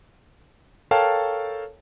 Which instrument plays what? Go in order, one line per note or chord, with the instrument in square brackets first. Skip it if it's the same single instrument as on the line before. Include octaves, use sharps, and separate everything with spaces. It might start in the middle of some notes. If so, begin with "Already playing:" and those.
[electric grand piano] A4 A#4 C#5 F5 G5 A5